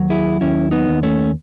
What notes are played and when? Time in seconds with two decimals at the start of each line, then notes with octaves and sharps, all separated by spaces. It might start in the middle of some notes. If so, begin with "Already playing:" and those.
Already playing: D#2 F#3
0.10 E4 G#4
0.41 D#2 C#4 E4
0.71 B3 D#4
0.88 D#2
1.03 A3 C#4